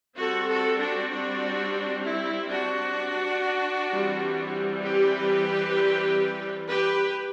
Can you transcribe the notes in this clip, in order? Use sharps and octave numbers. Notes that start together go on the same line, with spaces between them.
G3 C4 F#4 A4
F#4 A4
D4 F#4
D4 F#4
E4
D4 F#4
E3 G3 C4
G4 B4
G4 B4